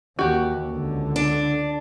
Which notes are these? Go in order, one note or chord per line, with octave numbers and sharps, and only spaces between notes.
D#2 F#4 G4
C#2 D3
D4